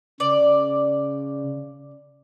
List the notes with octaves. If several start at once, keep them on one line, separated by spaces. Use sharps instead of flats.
C#3 D5